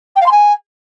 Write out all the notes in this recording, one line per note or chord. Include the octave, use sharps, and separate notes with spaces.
G5
F5
C6
G#5